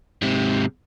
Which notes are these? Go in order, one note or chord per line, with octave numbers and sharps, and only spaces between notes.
G#2 C3